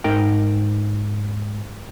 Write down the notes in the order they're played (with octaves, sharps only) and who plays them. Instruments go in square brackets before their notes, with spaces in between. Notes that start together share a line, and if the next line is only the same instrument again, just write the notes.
[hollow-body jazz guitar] G#2 D#4 A#4 G5